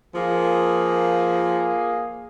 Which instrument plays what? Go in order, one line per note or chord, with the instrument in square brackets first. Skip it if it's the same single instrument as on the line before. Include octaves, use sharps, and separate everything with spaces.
[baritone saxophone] F3 [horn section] A#3 G#4